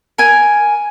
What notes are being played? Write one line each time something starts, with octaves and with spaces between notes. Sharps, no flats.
A#4 G#5